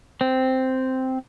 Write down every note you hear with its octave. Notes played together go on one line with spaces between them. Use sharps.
C4